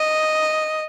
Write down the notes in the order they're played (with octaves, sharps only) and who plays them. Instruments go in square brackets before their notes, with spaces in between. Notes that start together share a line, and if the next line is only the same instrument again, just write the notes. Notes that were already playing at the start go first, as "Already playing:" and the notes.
Already playing: [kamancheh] D#5